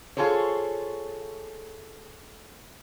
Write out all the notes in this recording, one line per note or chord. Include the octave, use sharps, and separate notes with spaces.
F4 G#4 A4 C5 C#5